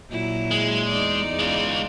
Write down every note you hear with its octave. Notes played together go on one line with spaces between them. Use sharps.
A#2 F#3 E4
G#3
E2 D#4 D5
G#3 F4